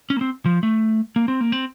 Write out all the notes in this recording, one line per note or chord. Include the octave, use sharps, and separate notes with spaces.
C#4
A#3
C4
F3
A3
A#3
C4
A#3
C4